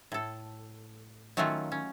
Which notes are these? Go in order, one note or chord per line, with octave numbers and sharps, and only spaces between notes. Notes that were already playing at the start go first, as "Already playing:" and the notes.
A2 A4
D#3 F#3 A3 C#4 F4 F#4
C#4